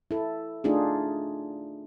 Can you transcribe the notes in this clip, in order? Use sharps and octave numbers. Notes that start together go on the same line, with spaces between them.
E4 A4
A3 D4 D#4 F4 G#4